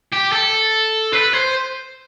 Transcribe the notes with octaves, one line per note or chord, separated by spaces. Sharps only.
G4
A4
B4
C5